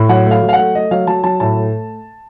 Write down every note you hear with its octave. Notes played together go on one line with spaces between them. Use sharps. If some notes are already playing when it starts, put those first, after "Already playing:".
Already playing: A2
F#3 F#5
A3
F5
F#3
F5
F#5
A3
A3 D#5
F#3 F5
F#3 A5
F#3 A5
A2 A5
A3